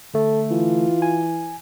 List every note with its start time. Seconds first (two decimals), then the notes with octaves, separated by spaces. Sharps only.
0.14 D3 A3 A4
0.50 E3 F4
1.02 G#5